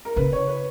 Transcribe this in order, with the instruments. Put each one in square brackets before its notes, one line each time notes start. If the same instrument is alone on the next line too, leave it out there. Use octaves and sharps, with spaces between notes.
[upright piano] A#4
[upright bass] C#3 [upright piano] B4
[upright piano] C#5
B4